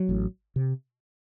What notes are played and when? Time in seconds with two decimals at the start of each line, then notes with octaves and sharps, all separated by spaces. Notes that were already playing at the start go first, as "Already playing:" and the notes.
Already playing: F#3
0.09 A1 A2
0.56 C3